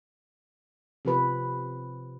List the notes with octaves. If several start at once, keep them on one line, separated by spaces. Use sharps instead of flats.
C3 F3 B4